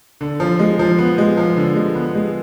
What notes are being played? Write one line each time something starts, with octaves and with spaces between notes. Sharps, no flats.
D3
F3
G#3
F3
B3
G#3
F3
D3
G#3
B3
G#3